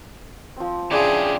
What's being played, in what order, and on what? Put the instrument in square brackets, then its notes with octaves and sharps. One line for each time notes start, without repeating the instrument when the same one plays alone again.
[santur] F3 C4
[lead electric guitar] C#3 G4 [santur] F3 D4 E4 [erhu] G#4